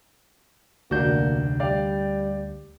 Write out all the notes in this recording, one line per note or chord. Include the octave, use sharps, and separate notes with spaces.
F1 D2 A#3 D4 F#4 G6
G3 D5 F5 G5